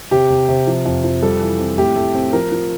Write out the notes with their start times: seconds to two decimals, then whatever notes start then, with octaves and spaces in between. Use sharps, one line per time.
0.11 C3 G4
0.30 C3
0.49 C3
0.67 F3
0.86 F2
1.04 F3
1.22 G3 A4
1.41 E3
1.60 C4
1.78 A2 G4
1.96 A3
2.15 C4
2.33 F3 A#4
2.52 F3